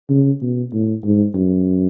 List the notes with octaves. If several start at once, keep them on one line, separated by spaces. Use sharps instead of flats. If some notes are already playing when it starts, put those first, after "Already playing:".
C#3
B2
A2
G#2
F#2